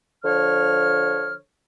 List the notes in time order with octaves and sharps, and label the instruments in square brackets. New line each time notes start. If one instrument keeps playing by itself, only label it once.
[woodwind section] D3 F3 C#5 F6